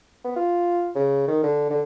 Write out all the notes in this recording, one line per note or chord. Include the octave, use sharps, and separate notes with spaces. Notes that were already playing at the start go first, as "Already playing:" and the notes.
B3
F4
C#3
D#3
D3
D3